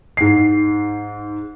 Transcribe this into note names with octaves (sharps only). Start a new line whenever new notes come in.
G#2 C7